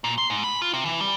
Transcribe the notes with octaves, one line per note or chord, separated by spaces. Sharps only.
A#2
C6
G#2
B5
F4
C3
E3
G3